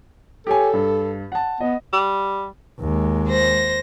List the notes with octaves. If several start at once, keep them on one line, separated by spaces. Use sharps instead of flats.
G4 A4 C#5 G#5
G2
F#5 A5
B3 D#5
G3
D#2 G#3
C5 A#6